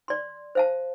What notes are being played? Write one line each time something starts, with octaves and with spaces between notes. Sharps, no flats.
D5 C6
C5 F5 A5